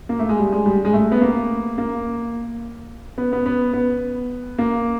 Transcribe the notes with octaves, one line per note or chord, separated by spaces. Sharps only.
A#3
A3
G#3
G3
G#3
G3
G#3
A3
B3
A#3
A#3
B3
B3
B3
B3
A#3